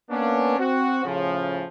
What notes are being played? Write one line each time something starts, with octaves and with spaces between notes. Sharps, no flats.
A#3 B3 C#4 D4
C4 F#4
A2 C#3 F3